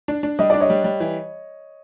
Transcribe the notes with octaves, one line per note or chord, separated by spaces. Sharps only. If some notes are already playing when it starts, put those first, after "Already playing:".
D4
D4
G3 D#5
D4 D5
C#5 D#5
G3
G3
E3